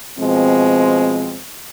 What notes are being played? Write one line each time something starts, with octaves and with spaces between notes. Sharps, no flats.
B2 F3 G#3 C4